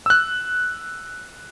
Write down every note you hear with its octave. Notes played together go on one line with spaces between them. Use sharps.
E6 F#6